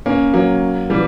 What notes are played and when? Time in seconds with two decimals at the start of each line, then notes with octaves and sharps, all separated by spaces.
0.06 A#3 C#4
0.34 F#3 A#3
0.90 E3 G3